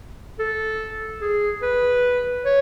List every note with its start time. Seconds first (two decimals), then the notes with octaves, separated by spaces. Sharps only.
0.39 A4
1.21 G#4
1.62 B4
2.45 C#5